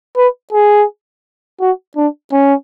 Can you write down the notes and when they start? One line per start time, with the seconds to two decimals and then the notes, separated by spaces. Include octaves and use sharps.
0.16 B4
0.52 G#4
1.60 F#4
1.96 D4
2.32 C#4